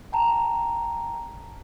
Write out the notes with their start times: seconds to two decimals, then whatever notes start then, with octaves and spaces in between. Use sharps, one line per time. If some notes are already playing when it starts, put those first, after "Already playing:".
0.12 G5 A5 A#5